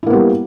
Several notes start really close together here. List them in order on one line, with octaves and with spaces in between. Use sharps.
E4 A#3 B3 G3